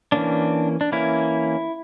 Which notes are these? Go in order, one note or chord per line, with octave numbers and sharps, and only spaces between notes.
E3 A#3 C#4 D4
D4
E3 A#3 C#4 E4